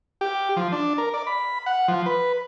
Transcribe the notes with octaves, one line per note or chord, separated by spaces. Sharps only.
G4
F3
D4
A#4
D5
B5
F#5
F3
B4